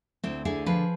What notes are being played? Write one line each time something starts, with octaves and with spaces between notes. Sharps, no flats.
D2 C4 E4
D3 E4 G#4
F3 G#4 B4